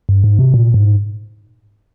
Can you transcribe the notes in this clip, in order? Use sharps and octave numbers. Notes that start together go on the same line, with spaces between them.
G2
G#2
C3
A#2
G#2